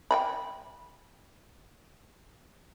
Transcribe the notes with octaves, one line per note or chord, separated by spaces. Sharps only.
G5 G#5 B5